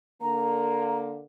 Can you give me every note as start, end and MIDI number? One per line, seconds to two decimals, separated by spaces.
0.22 1.22 50
0.22 1.22 58
0.22 0.96 82